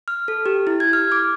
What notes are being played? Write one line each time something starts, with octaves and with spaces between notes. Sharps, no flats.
F6
A4
G4
E4
G#6
F6
D6